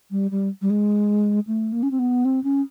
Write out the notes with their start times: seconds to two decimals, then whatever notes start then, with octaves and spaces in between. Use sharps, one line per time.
0.11 G3
0.31 G3
0.62 G3
0.70 G#3
1.47 A3
1.72 A#3
1.83 C#4
1.91 C4
1.99 B3
2.25 C4
2.44 C#4